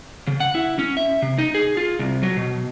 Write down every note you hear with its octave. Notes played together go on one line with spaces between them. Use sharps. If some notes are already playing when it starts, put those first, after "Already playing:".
C#3
F#5
E4
C#4
E5
C3
D#4
G#4
F4
C2
F#3
B2